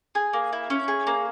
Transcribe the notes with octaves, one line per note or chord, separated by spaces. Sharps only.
G#4
A#3
E4
C#4
G#4
A#3